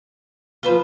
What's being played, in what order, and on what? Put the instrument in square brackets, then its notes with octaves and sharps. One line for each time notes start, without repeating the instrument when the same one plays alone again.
[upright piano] F3 B5 G7 [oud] F4 B4 C5